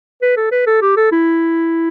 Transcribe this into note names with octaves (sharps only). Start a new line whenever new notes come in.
B4
A4
B4
A4
G4
A4
E4